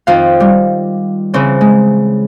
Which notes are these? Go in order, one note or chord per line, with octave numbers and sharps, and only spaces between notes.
F2 D#3 F5
G3
C#3 E3 C4 C#4
G#3